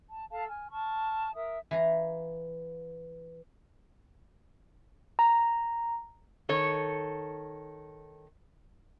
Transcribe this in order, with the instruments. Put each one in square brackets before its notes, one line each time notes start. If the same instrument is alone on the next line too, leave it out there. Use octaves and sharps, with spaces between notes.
[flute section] A5
A4 F5 A5
G#5 F6
A5 C#6 F6
A#4 E5 D#6
[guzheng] E3 F5 A#5
[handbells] A#5
[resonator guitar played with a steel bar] D#3 A4 C#5